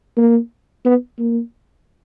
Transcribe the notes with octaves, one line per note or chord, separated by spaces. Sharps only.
A#3
B3
A#3